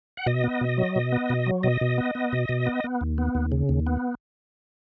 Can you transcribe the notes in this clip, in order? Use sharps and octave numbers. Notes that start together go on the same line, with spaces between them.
F#5
B2 D#5
B3
B2
F#3
B2
B3
B2
F#3
B2 D#5
B2
B3
B3
B2
B2
B3
B3
D#2
B3
D#2
C#3
D#2
B3